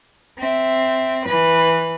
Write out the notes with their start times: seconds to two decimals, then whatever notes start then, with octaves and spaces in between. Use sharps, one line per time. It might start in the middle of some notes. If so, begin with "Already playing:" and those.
0.38 C4 E5
1.25 E3 B4